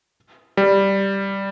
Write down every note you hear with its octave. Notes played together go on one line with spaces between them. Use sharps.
G3